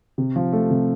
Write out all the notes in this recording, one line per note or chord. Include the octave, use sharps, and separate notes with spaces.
C3
F3
A3
C3